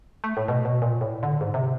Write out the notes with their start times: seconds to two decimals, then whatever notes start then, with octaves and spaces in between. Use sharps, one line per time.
0.24 A3
0.37 A2
0.48 B2
0.65 B2
0.82 A#2
1.01 A2
1.23 D3
1.41 G#2
1.54 C3